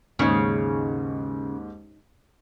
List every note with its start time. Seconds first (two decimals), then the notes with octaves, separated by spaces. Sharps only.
0.19 D#2 G#2 C#3 C#4 D#4 C#5